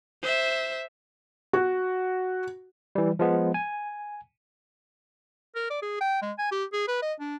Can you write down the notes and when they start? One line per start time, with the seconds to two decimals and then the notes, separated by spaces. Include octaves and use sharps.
0.22 C5 E5
1.53 F#4
2.95 E3 G3
3.19 F3 G#3 B3
3.54 G#5
5.55 A#4
5.70 D5
5.82 G#4
6.01 G5
6.22 G#3
6.38 G#5
6.51 G4
6.73 G#4
6.88 B4
7.02 D#5
7.20 D4